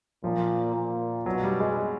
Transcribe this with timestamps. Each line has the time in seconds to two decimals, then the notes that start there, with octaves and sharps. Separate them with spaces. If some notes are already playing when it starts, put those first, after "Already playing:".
0.24 A#2 F3
0.75 A#2
1.26 B2 F#3
1.44 G3
1.60 G#3